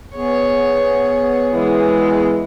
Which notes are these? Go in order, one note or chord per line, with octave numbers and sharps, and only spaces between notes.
B3 G#4 C#5
E3 G#3